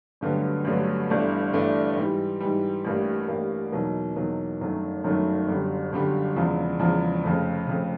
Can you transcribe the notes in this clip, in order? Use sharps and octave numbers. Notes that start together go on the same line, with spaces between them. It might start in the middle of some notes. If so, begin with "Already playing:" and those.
A1 G2 D3 F#3 B3
A1 G2 D3 F#3 B3
G1 G2 E3 A3 D4
G1 G2 E3 A3 D4
G#2 E3 G3
G#2 E3 G3
A1 G2 E3 G3 A#3
A1 G2 E3 G3 A#3
E2 B2 F#3 A#3 D#4
E2 B2 F#3 A#3 D#4
G1 F#2 D#3 F#3 A3
G1 F#2 D#3 F#3 A3
G1 F#2 D3 G3
G1 F#2 D3 G3
E1 E2 C#3 F3
E1 E2 C#3 F3
F1 F2 C#3
F1 F2 C#3